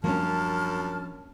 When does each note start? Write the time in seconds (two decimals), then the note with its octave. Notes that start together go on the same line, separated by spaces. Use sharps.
0.04 F#2 F3 G3 A#3 C#4 D4 A5 F6